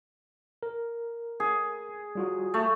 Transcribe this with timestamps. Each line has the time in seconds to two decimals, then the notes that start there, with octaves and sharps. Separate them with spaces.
0.63 A#4
1.40 G#4
2.15 G3 F4 F#4
2.54 A3